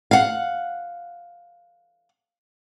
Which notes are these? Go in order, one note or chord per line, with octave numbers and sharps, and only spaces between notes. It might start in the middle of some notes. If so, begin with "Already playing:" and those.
F5 F#5